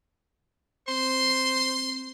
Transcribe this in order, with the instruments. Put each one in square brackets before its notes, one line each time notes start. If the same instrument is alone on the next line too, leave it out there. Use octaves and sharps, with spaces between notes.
[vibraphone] C4 [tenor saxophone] C5 [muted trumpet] C6